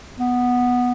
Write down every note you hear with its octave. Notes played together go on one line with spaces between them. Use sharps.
B3